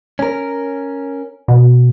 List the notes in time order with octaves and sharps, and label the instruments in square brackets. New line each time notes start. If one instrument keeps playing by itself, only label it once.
[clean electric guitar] C#4 A#4
[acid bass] B2